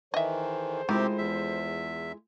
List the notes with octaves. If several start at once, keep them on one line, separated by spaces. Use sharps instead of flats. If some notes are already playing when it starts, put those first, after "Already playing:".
D#3 E3 G#4 A4 C5 D#5 E5
C3 D#3 G#3 C4 E4 F4 G4
E2 E5